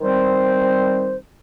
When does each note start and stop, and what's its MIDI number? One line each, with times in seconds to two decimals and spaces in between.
0.01 1.17 51
0.01 1.17 55
0.01 1.17 60
0.01 1.17 72